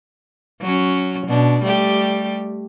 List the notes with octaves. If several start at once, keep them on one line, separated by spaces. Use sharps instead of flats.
F#3 C#4
B2 D4
G3 A3 G4